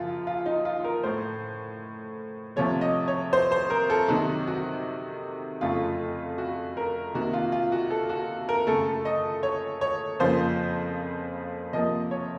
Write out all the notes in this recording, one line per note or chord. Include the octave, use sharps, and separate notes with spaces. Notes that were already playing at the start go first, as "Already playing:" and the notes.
Already playing: F#2 C#3 F3 F4
F4
D#4
F4
A#4
A2 A3 C5
C3 F3 A3 C#5
D#5
C#5
C5
C5
A#4
A4
C3 D#3 F#3 F#4
F#4
F2 C#3 A3 F4
F#4
A#4
C3 D#3 A#3 F#4
F4
F4
F#4
A4
F#4
A#4
F#2 C#3 A3 A4
D#5
C#5
C#5
F2 C#3 F3 A#3 C5
C3 F3 A#3 D#5
C#5